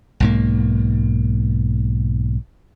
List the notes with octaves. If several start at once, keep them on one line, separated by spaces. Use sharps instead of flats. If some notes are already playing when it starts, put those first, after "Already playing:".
B1 G#2 A#3